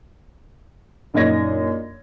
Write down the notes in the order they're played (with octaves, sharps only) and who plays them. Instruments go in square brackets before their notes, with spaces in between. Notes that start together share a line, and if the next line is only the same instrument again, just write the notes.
[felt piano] A#1 F#2 D#4 D#5 G#6 A#6